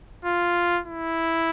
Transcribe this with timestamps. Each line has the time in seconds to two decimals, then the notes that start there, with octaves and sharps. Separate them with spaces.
0.25 F4
0.87 E4